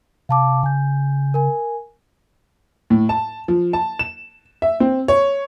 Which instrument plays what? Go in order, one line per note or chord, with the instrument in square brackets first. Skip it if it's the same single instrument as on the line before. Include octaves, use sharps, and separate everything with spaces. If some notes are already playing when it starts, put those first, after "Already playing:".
[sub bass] C3 [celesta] F5 A5 D6
[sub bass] C#3 [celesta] G#5 G6
[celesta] A#4 G#5
[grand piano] A2
A5
F3
A5
E7
E5
C4
C#5